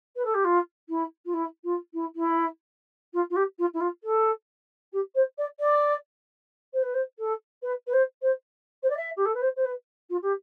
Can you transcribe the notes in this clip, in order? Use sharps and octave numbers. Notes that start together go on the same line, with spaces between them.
B4
A4
G4
F4
E4
F4
E4
F4
E4
E4
F4
F4
G4
F4
E4
F4
A4
G4
C5
D5
D5
C5
B4
C5
A4
B4
B4
C5
C5
C5
D5
E5
G4
A4
B4
C5
C5
B4
F4
G4